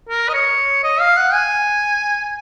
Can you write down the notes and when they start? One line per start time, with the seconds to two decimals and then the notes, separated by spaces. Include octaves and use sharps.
0.09 A#4
0.28 D#5
0.34 C#5
0.83 D#5
1.00 F5
1.17 F#5
1.34 G#5